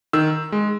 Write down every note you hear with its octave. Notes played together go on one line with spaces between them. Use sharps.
D#3 E6
G#3